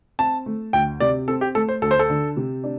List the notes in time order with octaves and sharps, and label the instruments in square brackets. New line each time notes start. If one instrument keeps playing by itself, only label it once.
[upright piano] C4 [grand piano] A5
[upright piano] A3
[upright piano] D2 [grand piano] G5
[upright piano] C3 [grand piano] D5
[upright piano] C4 [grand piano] A4
[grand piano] G4
[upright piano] A3 [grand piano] A4
[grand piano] C5
[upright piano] D2 [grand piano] A4
[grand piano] C5
A4
[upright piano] D3
C3
D4